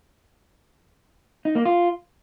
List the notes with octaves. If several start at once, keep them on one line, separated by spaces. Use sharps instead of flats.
D#4
A#3
F4